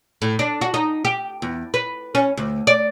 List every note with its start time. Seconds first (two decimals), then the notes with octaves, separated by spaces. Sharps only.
0.22 A2
0.39 D4
0.61 F#4
0.74 D#4
1.05 G4
1.42 E2
1.74 B4
2.15 C#4
2.37 D2
2.67 D5